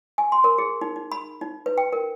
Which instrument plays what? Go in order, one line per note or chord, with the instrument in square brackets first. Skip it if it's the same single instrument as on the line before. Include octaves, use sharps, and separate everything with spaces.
[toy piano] G#5
C6
A#4
G#4
D#4
D#4
B5
D#4
B4
G5
A#4